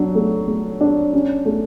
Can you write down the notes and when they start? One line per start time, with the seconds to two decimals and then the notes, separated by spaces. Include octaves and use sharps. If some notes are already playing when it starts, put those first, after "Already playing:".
Already playing: F#3 D4
0.15 A3
0.48 A3
0.81 D4
1.13 C#4
1.46 A3